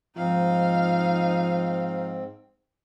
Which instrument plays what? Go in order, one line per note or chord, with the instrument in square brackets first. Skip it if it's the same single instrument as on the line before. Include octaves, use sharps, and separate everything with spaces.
[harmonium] G#2 C4 [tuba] F3 [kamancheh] D#4 F5